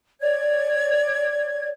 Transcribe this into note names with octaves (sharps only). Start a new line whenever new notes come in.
C#5 D5 G#6